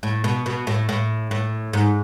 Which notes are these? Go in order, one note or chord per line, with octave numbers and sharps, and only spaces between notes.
A2
B2
B2
A2
A2
A2
G#2